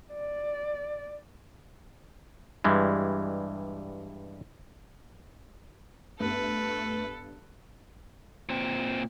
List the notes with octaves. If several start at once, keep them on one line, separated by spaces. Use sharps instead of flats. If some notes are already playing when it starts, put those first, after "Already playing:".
D5
G2 E3 G3 G#3
G2 A3 B3 A4 B4
A#2 C4